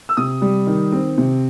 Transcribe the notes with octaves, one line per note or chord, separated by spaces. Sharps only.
E6
C3 D#6
G3
D#3
C4
C3